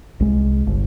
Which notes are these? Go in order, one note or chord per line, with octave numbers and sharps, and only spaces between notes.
C2 G#3
G1